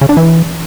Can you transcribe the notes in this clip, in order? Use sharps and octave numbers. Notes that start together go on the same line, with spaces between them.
C#3
D4
E3